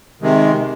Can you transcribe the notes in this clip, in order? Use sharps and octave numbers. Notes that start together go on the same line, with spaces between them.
C3 D#3 G#3